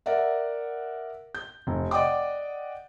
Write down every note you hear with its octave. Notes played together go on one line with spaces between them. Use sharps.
A#4 D5 E5 F#5
G6
F1
D5 D#5 F#5 G5 D6